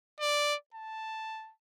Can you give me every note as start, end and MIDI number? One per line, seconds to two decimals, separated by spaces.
0.20 0.55 74
0.74 1.52 81